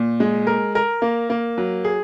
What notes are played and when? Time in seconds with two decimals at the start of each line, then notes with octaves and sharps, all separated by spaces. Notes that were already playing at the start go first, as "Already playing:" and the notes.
Already playing: A#2
0.20 G#3
0.47 A#4
0.75 A#4
1.02 A#3
1.30 A#3
1.58 F#3
1.85 G#4